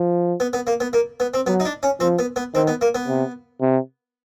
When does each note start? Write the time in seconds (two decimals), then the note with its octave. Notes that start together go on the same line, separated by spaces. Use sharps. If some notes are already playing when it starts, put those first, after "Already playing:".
Already playing: F3
0.40 B3
0.53 B3
0.67 A#3
0.80 B3
0.93 A#3
1.20 B3
1.34 C4
1.47 F#3 B3
1.60 D#4
1.65 D4
1.83 C#4
2.00 F3 C4
2.19 B3
2.36 B3
2.54 D#3 C4
2.67 B3
2.81 A#3
2.95 B3
3.07 C3
3.62 C3